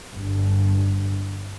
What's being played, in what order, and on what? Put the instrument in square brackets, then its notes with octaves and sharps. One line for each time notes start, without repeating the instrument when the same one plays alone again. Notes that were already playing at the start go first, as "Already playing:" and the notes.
[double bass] G1 G2